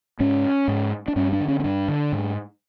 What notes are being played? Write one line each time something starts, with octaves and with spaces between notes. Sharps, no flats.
G#2 C#4
G#2
D4
G2 C#4
D4
D3
C#4
C#4
G2 D4
D3
G#2